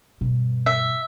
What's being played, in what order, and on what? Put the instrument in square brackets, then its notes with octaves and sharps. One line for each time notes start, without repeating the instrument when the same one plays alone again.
[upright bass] G2 B2
[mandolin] E5